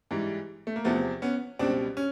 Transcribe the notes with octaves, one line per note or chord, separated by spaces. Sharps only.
G#2 E3 G3
A3
A#3
E2 C3 F3 A3 B3
B3 C#4
C#2 B2 G3 C4 D4
C#4